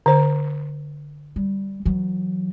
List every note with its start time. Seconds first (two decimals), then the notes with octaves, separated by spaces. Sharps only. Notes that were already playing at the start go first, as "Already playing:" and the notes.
0.06 D3 C5
1.36 G3
1.85 E3 F#3